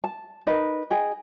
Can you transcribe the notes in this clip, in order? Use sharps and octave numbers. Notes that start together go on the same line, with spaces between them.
A5
D#4 A#4 B4 D#5
G#4 D#5 G5